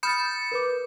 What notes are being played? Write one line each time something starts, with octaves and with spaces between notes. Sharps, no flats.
B5 D#6 F6 G6 A6 C#7
A#4 B4 D6